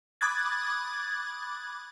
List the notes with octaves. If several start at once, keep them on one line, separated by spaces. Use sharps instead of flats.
B5 D6 D#6 F#6 G#6 A6